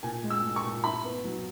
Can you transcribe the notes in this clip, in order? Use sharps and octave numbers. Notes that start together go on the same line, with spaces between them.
A#2 G#5
G#3
E6
G#3
C#6
A#2
E4 B5
B3
F#3